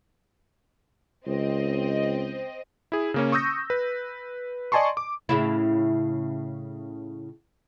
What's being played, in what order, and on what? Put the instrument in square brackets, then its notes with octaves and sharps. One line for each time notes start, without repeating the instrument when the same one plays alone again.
[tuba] C#2 [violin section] C4 D#5
[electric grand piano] E4 G#4
C#3 A#3 C#4
C#6 D#6 E6 G6 A#6
B4
D5 D#5 G#5 A5 C6 C#6
D6
[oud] A2 C#3 E4